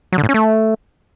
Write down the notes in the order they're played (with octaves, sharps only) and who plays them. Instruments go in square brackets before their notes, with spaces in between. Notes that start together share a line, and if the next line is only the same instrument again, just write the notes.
[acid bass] F#3
D3
A2
C#4
A3